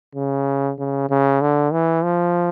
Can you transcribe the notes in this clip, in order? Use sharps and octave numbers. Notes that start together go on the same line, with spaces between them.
C#3
C#3
C#3
D3
E3
F3